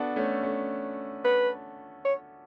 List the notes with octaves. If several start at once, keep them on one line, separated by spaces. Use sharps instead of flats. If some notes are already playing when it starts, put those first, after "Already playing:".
Already playing: B3 D4 F#4 A4
A3 C#4
A3 C#4
B4
C#5